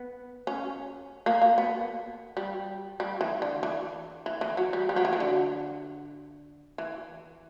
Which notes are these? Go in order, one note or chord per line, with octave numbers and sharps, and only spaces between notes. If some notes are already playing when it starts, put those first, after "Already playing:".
Already playing: B3
C#4
A#3
A#3
B3
G3
G3
E3
D3
E3
E3
E3
F#3
G3
G3
F#3
E3
F#3
D3
E3